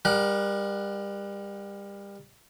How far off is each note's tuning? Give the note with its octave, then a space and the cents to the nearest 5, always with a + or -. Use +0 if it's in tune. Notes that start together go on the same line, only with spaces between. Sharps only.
G3 +30 A#4 +30 F#5 +0